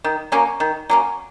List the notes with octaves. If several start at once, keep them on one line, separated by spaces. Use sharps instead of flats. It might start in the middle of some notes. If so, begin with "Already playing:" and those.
D#3
F#3 A#3 C#4
D#3
F#3 A#3 C#4